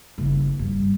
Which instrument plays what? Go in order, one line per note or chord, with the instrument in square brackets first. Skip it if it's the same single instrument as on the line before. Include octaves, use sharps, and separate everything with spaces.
[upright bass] F#1
G2